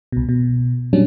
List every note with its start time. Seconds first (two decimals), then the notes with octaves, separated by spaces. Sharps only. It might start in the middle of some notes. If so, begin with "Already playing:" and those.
0.12 C2 B2
0.29 B2
0.93 A#2 F#3 G3 C#4 D4